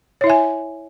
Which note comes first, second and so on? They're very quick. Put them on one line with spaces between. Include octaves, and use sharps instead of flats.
C#5 E4 E5 G#5